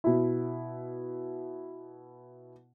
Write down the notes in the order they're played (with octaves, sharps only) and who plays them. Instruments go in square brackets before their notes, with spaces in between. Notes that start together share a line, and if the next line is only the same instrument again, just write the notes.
[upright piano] B2 E4